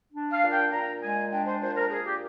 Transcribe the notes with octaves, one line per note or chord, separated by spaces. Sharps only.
D4
F5
A#2
G5
A#2 A#5
G#3 G#5
D4 G5
C5
A#2 C5
A#4
A#2 G#4
G4